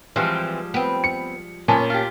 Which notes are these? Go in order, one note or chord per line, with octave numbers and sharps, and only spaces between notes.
E3 F3 G3 G#3 C4
B3 C4
C#7
A#2 B3 C#4 C#5 A5
F4 G4